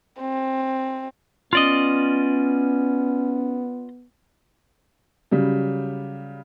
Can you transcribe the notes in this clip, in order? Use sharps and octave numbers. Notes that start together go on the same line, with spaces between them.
C4
B3 C#4 F4 D5 D#5
C#3 F#3 G3